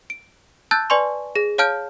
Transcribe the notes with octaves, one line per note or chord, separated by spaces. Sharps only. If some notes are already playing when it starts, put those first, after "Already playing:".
D7
A5 E6 F#6 G6 A6
B4 D5 G#5 C6 C#6
G#4 A#6
C#5 F5 A5 F6 G6 D7